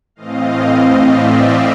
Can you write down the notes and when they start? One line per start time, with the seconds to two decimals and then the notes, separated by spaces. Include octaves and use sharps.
0.16 A2 E3 A3 C4 D#5 F5
0.91 D5 E5